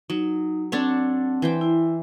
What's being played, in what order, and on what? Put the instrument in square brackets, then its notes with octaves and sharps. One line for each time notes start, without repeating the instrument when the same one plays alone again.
[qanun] F#3 [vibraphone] D#4
[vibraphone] C4 F#5 [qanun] D4 A4 C#5
[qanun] E3 C5 G5
[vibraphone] E4